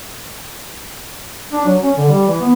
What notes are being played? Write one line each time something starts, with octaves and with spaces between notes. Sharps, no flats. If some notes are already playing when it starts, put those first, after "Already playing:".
D4
F#3
C#4
D3
G3
E3
B3